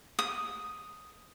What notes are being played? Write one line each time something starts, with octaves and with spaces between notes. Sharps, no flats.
D#6